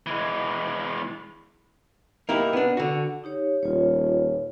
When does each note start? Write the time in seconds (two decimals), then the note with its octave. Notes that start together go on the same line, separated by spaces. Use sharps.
0.06 E3 G#3
2.29 A#3 D#4 E4 G4
2.53 B3 D4
2.77 D3 F#4
3.24 D#4 G4 C#5
3.63 D#1 F4 C#5